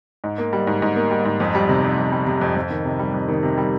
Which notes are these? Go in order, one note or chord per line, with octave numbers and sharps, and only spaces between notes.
G#2
A#3
G3
G#2
G#2
A#3
G3
G#2
F2
G3
C3
F2
F2
G3
C3
F2
F2
D#3
C3
G3
F2
D#3
C3
G3